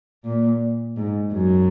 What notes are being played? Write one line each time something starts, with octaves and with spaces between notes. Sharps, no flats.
A#2
G#2
F#2